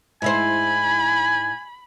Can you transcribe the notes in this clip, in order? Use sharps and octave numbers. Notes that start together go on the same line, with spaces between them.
G#2 E4 C5 G#5 B5